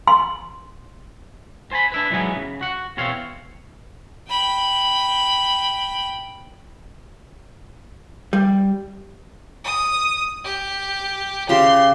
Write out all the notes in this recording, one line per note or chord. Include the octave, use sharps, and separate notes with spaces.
C6
C5 G#5 A5 B5 C6
D4 E4 B4
G#2 E3 F#3 G#3 B3 G#5
C#3
F#4 F#5
E2 B2 C4 C#5 F5
G5 B5
G3
D#6
G4
C#3 G4 C5 C6